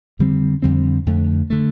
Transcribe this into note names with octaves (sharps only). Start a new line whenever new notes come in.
F2 D3 G3 C4
F2 D3 G3 C4
F2 D3 A3
D3 A3